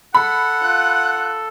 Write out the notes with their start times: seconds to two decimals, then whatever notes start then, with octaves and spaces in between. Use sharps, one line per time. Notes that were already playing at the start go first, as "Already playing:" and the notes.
0.15 A4 F#5 B5
0.61 F4 F#6